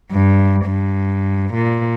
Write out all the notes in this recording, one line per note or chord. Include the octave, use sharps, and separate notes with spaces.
G2
G2
A#2